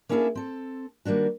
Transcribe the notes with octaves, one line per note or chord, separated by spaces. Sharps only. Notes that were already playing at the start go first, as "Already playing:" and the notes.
A#3 C#4 D4 E4 G#4 A4
C4 A4
D#3 G3 A#3 D4 F#4